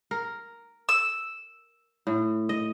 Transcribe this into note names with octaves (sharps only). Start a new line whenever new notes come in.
A#4
E6
A2
D#5